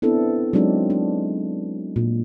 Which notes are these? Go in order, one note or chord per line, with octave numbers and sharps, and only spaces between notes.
B3 C4 D4 E4 A4
F#3 G#3 C4 D4 D#4
D4
A#2